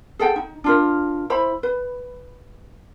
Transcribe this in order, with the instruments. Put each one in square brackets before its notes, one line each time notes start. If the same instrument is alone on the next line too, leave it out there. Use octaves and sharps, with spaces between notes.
[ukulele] G#4 A4 F#5 G5
D#4
D4 F4 A#4
E4 C5 B5
B4